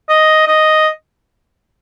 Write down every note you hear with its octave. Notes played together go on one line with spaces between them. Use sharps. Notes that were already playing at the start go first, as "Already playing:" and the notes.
D#5
D#5